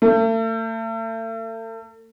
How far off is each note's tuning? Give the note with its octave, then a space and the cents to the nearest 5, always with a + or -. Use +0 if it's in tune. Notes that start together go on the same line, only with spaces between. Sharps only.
A3 +40